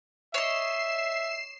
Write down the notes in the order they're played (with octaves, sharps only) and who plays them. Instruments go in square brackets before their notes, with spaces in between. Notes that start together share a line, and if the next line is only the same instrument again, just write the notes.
[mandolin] C#5 D#5 [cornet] E5 [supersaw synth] C7 E7